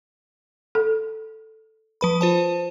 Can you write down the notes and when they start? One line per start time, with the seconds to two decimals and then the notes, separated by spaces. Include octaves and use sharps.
0.75 A4
2.01 F3 B4 B5
2.21 F4 C5 A5